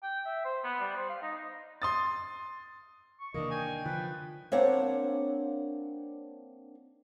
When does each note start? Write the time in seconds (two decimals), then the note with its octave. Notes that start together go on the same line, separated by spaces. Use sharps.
0.03 G5
0.26 E5
0.45 C5
0.64 B3
0.80 G3
0.97 C5
1.09 F5
1.22 D#4
1.82 C6 D#6 A6
3.20 C#6
3.34 C3 D#3 E3 A#3 D4 D#5
3.50 G5 G#5
3.85 D3 F3 B4
4.52 A#3 C4 D4 C#5 F#5